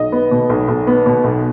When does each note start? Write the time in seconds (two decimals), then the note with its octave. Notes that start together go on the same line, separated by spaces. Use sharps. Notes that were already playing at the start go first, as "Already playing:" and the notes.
Already playing: B1 D#5
0.12 B3
0.31 B2
0.50 B1
0.68 B1
0.87 B3
1.06 B2
1.24 B1